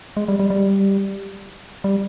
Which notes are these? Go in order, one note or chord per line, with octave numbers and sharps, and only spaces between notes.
G#3
G3
G3
G3
G3